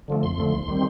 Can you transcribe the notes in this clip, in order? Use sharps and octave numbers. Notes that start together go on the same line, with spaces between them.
D3 F3 A3
F2 C6
D3 F3 A3
D#2
D#3 G3 C4